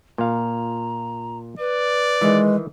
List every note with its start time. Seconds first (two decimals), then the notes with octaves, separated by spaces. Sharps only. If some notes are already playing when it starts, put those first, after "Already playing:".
0.18 A#2 F5 A#5
1.59 B4 D5
2.21 D#3 E3 G#3